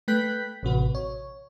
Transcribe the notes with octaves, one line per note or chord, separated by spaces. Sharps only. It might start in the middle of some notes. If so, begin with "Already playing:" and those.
A3 B4 G5 F#6 G6 B6
A1 C3 F#4 B4
C#5